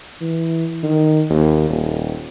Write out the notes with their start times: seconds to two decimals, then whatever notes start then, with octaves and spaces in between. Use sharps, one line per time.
0.21 E3
0.83 D#3
1.29 D#2
1.70 D#1